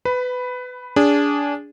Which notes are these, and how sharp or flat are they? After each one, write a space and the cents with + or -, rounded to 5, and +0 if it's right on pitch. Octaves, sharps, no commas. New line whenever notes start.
B4 +20 B5 +0
D4 -25 G#4 -15